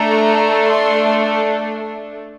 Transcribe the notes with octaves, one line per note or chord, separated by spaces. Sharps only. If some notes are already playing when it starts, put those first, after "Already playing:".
Already playing: A3 D4 A4 A#5
C6